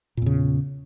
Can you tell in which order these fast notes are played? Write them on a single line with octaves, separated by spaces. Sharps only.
A#2 E2 C#3